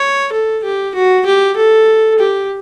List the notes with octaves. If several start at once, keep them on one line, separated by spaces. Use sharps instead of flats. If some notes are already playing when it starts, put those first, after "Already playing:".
Already playing: C#5
A4
G4
F#4
G4
A4
G4